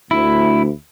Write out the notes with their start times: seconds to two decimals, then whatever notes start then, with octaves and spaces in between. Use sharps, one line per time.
0.11 D2 E4